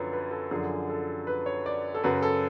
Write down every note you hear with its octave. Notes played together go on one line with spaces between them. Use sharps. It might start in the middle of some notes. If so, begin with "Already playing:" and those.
Already playing: F#2 D3 F3 B4 C#5
B4
A4
F#2 D3 F3 G#4
A4
B4
C#5
D5
A4
F#2 C#3 F#3 B4
A4